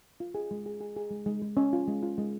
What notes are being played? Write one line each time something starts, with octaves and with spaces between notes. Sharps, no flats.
F4
G#4
G#3
G#4
G#4
G#4
G#3
G#3
G#3
C#4
F4
G#3
F4
G#3